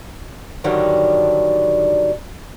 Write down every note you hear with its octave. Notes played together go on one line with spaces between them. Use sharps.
G2 D3 D#3 F#3 G3